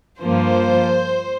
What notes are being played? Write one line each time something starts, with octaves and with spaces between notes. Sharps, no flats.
G2 F3 A#3 F4 C5